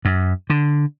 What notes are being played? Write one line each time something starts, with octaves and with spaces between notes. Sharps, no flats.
F#2
D3